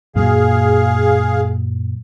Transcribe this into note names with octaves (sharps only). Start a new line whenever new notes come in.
F#2 A#2 F#3 G#4 F5